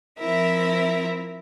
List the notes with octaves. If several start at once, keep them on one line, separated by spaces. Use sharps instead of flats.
F3 C4 E4 A#4 E5